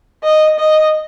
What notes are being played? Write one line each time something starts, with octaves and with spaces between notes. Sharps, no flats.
D#5
D#5